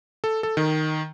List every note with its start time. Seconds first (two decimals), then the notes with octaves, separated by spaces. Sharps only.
0.24 A4
0.43 A4
0.57 D#3